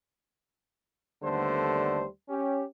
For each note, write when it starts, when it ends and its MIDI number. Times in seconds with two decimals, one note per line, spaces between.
1.23 2.05 39
1.23 2.05 50
1.23 2.05 55
1.23 2.05 57
1.23 2.05 59
1.23 2.05 72
2.29 2.62 61
2.29 2.62 67